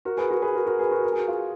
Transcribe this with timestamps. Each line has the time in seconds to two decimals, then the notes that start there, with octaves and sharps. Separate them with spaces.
0.05 F#4 A#4
0.17 G#4 B4
0.30 F#4 A#4
0.42 G#4 B4
0.55 F#4 A#4
0.67 F#4 A#4
0.79 G#4 B4
0.91 F#4 A#4
1.04 A#4
1.12 G#4
1.20 F#4
1.28 F4 G#4